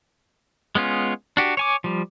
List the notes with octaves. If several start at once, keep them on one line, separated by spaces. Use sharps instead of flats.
G#3 B3 C#4 F4
D4 F#4 G4
C#5 G#5 D6
F3 G3